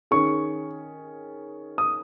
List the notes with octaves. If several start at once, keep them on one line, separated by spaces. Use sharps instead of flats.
D#3 C#4 G#4 C#6
D#6